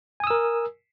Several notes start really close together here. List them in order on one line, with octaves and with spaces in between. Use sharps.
G#5 D#6 E6 A#4